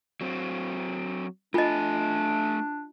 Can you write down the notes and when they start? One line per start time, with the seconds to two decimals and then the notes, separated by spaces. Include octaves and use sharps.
0.21 F#3 C4
1.54 A3 D4 F4 D#5 G#5